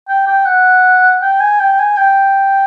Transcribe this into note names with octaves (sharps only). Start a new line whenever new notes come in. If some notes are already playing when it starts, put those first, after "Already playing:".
G5
G5
F#5
G5
G#5
G5
G#5
G5